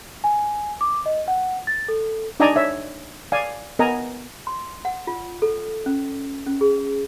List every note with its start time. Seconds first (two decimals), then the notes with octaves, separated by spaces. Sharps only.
0.24 G#5
0.81 D6
1.06 D#5
1.28 F#5
1.67 A6
1.88 A4
2.40 D4 D#4 D5 D#5 G#5 A#5
2.56 C#5 E5
3.32 D5 F5 G#5
3.79 B3 A#4 D#5 G#5 A#5
4.47 C6
4.85 F#5
5.07 F4
5.42 A4
5.86 C#4
6.46 C#4
6.61 G#4